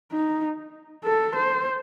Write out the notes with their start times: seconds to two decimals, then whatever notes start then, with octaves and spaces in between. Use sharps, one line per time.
0.12 D#4
1.04 A4
1.35 C5